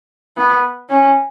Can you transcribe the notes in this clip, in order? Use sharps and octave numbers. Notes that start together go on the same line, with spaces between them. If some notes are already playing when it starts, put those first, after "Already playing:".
B3
C#4